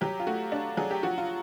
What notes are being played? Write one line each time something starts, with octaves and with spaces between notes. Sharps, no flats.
F#3 G4
F4
A3 F#4
D4
F#3 G#4
G4
F3 F#4
F4